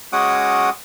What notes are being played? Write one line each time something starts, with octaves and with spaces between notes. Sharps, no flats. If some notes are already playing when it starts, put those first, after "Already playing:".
G#3 C#4 F#4 F#5 D6 D#6